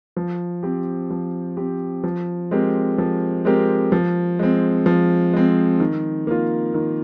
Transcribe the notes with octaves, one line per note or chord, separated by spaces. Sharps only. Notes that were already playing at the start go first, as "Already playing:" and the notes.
F3
C4 G4
F3
C4 G4
F3
G#3 C4 G4 A#4
F3
G#3 C4 G4 A#4
F3
G#3 C4
F3
G#3 C4
D#3
A#3 F4
D#3